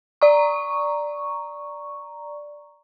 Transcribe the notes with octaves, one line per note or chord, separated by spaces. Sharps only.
D5 A#5 C#6